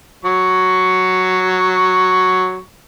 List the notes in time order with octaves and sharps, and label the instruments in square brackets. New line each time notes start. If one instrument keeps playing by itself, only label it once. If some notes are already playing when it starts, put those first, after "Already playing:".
[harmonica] F#3 C#6